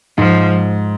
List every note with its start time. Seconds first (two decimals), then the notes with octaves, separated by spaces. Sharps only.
0.18 G#2 F3